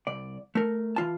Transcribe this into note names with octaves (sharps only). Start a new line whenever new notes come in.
C2 D5
A3 A#4
E3 F4 A5